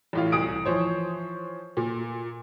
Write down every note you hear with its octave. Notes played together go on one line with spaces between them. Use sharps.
A1 A2 F4
C2 E3 D#6 D7
E3 F3 C5 C#5
A#2